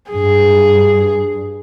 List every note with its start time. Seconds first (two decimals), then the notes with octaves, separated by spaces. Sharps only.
0.11 G2 G#4